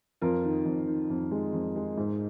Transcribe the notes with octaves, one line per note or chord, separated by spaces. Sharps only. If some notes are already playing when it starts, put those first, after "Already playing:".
F2 F4 A#4
D#3
F2
D#3
F2
G#3
F2
G#3
G#2